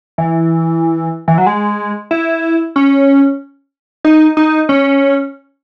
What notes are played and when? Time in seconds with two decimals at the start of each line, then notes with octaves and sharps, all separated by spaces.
0.18 E3
1.28 E3
1.38 F#3
1.47 G#3
2.11 E4
2.76 C#4
4.05 D#4
4.37 D#4
4.69 C#4